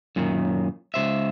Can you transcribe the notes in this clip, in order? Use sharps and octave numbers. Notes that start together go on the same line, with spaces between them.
F#2 A#2 D#3
C#2 C5 E5